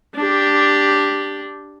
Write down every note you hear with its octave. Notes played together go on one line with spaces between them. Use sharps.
D4 G4